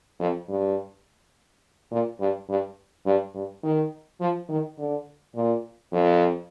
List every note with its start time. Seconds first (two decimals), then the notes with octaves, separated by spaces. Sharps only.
0.20 F2
0.49 G2
1.91 A#2
2.20 G2
2.49 G2
3.06 G2
3.34 G2
3.63 D#3
4.21 F3
4.49 D#3
4.78 D3
5.35 A#2
5.93 F2